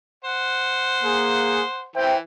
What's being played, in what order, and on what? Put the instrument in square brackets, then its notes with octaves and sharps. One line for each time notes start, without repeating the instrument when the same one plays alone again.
[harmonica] C5 F#5
[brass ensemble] A#3 G#4
[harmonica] E3 [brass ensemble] C5 E5 G5